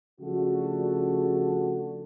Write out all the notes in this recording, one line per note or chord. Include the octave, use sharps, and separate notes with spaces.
C#3 F3 A3 D4 F#4